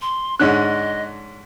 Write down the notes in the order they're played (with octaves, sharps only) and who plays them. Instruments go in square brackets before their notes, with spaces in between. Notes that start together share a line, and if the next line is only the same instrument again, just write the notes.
[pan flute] C6
[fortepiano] G#2 D3 C#4 [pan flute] D#5 [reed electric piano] F#6